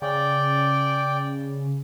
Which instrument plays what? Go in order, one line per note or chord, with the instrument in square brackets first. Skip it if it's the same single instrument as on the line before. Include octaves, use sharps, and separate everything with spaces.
[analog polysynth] C#3 [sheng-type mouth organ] D5 G5